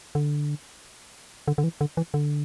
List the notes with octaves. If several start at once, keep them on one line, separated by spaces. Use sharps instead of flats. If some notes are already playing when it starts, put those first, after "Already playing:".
D3
D3
D3
E3
D3
E3
D3